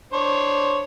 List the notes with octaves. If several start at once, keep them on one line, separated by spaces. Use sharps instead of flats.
D4 C5 C#5